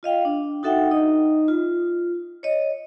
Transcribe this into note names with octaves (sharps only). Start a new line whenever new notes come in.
F4 D#5 F5 G5
D4
D#4 F#4 A4 E5 F#5 G5
D#4 D#5
F4
C#5 D#5